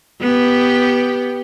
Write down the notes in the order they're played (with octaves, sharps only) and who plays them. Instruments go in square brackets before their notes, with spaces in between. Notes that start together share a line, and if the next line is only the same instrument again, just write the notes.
[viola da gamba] B3 G4